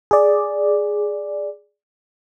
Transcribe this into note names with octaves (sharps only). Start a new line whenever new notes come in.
G#4 D5